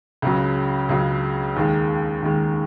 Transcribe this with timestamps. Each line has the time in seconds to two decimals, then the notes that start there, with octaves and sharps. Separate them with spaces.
0.22 C#2 C#3 F#3
0.89 C#2 C#3 F#3
1.56 D#2 D#3 G#3
2.22 D#2 D#3 G#3